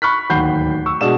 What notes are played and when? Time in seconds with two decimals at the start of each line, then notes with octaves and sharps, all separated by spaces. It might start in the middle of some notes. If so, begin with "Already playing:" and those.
0.02 B5 C#6 F6 F#6 B6
0.30 D1 D#2 F#5 B5 G6 C7
0.86 C#6 E6
1.01 B2 G#3 D4 F#4 E7